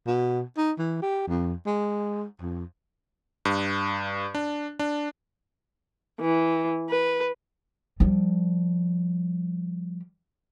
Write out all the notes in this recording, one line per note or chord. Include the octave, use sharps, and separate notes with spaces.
B2
D#4
E3
G4
F2
G#3
F2
G2
D4
D4
E3
B4
F3 G3